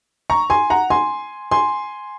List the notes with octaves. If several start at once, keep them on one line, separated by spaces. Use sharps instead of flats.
A#5 C#6
G#5 C6
F#5 A#5
G#5 C6
G#5 C6